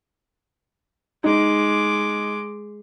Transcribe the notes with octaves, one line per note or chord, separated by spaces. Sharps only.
G#3 D#4 D6